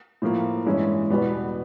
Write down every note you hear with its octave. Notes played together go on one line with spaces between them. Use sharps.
A2 F3 A#3
G2 E3 G#3 C#4 E4
E2 B2 G3 B3